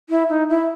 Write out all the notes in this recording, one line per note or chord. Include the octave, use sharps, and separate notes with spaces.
E4
D#4
E4